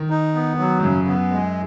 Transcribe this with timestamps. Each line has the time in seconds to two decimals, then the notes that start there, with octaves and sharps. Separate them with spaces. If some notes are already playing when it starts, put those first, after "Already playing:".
Already playing: D#3
0.10 D#4
0.35 B3
0.59 F#3
0.80 G#2
0.83 F#2 C#3
1.07 B3
1.32 G#3